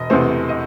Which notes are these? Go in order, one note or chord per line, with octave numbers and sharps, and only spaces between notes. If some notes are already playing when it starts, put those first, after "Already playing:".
Already playing: E1 D#5
E2 C3 E3 A3 C5
D#5